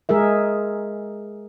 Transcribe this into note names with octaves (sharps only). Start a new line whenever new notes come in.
G#3 G#4 A#4 E5